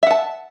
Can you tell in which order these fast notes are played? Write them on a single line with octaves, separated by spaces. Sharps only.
E5 F#5 A5